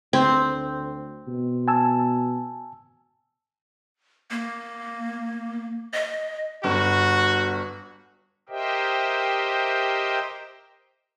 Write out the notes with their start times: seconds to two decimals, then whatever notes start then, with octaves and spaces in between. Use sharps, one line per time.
0.13 D2 C4
1.28 B2
1.68 G#5 A5 E6
4.31 A#3
5.94 D#5
6.64 G1 F#4
8.49 G4 A#4 C5 D#5 E5 G5